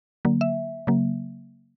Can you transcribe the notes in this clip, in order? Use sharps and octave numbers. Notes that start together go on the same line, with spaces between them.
D3 F#3 A#3
E5
C#3 F#3 A#3